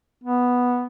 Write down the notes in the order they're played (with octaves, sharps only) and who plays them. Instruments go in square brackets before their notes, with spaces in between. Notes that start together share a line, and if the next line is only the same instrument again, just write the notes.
[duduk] B3